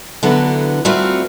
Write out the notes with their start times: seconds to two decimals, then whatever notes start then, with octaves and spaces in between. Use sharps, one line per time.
0.23 D3 E3 F#3 B3 A4 B4
0.85 G3 A3 C4 F4 F#4 A#4